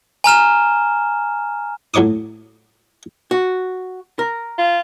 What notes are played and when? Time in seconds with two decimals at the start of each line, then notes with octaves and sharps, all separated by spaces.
0.24 G#5 A#5 F6 E7
1.94 A2 F#3 C#5 D6 D#6
3.31 F#4
4.19 A#4
4.58 F4